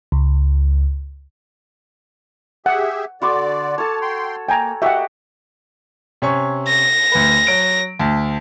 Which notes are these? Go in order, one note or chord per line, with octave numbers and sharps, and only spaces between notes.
C#2
G4 G#4 E5 F#5
D3 F#4 D5 C6 D6
A4 C#5 A5
G5 C6
A#3 G5 G#5 A#5
A#3 F#4 G4 D#5 E5 F#5
C3 C#4 C#6
A#6
D2 B4
F#3 D7
D2 A5